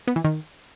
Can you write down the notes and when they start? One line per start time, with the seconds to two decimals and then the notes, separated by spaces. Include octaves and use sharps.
0.07 B3
0.16 E3
0.24 D#3